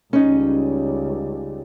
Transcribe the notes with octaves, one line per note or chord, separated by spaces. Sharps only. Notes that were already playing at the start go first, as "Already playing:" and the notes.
C#2 G3 C#4 D#4